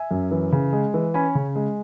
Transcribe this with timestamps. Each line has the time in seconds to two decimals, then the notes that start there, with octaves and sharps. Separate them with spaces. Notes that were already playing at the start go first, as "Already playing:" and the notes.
Already playing: E5 G#5
0.11 F#2
0.31 E3
0.52 C#3
0.73 G#3
0.94 E3
1.14 C#4 G#5 B5
1.35 C#3
1.56 G#3